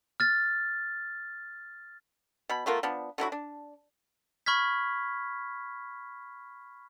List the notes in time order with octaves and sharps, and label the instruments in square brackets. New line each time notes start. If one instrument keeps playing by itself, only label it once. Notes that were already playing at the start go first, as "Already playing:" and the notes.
[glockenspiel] F6 A6
[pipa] B2 B5
A3 B3 F4 A#4
F3 B3 D4
D3 F#3 E4 F#4
D4
[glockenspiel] B5 C#6 F6 G#6 B6